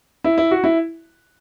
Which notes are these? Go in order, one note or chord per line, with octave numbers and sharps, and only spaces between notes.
E4
E4
F#4
E4